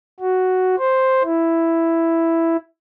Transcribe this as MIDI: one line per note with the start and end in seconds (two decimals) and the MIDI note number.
0.20 0.76 66
0.79 1.23 72
1.24 2.57 64